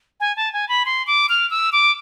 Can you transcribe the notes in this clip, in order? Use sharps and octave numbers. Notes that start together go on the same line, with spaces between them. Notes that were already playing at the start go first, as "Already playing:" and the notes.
G#5
A5
G#5
B5
C6
D6
F6
E6
D6